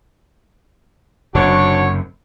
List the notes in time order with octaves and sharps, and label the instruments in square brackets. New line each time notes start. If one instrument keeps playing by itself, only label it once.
[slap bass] F#1 F#2 C3 [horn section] D4 F#4 C#5